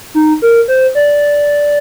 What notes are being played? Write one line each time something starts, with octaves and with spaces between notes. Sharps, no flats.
D#4
A#4
C5
D5